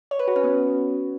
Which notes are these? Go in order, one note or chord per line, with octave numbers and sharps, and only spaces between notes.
C#5
B4
F#4
C#4
B3